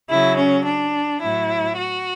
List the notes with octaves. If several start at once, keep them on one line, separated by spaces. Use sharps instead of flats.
C#3 F#3 E4
C#4
D4
A2 F#3 E4
F#4